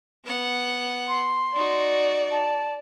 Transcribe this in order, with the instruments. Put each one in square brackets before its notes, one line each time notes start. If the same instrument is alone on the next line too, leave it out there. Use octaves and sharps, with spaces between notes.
[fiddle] B3 F#5
[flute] C6
[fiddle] D#4 F#4 [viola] D5
[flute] A5